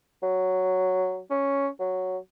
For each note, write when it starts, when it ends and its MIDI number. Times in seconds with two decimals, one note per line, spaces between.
0.23 1.20 54
1.30 1.68 61
1.79 2.17 54